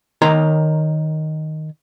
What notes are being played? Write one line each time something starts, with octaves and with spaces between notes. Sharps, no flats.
D#3 A#4 C#5 A#5 C6